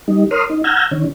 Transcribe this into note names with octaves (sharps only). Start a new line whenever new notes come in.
G3 D#4
A#4 C#5 C6 D#6 F6
D#4
F#5 A#5 E6 F6 G6 G#6
D#3 C#4